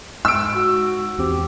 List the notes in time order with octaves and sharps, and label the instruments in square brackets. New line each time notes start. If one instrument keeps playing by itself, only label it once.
[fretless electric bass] G#2 [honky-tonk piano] E6 D7
[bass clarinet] F#4
[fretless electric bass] E2 C4 [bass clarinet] G4